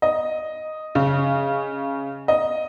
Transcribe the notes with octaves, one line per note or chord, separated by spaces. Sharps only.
D#5
C#3
D#5